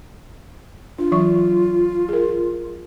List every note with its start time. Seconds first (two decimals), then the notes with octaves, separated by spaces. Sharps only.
0.98 D4 F4
1.12 E3 F#3 C#6
2.09 G#4 A#4